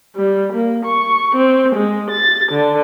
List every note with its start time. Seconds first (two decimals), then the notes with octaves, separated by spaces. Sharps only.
0.15 G3
0.53 A#3
0.86 C#6
1.35 C4
1.75 G#3
2.10 A6
2.52 D3